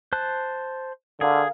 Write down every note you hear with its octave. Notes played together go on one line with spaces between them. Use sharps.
C5 A5 F#6
D3 G#4 A#4 F5